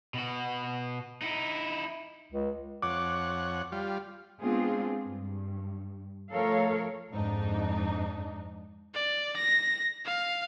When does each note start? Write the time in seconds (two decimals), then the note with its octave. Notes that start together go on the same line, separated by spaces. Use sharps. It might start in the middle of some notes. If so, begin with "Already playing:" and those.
0.14 B2 F#4
1.21 D#4 E4
2.32 C#2
2.82 F2 C#5 F#5 D6
3.72 G3 F4
4.41 G#3 B3 C4 D4 F4 G#4
5.03 G2
6.31 F3 A3 A4 A#4 C#5 F5
7.10 F2 G#2 D4 D#4
8.94 D5
9.37 A#6
10.05 F5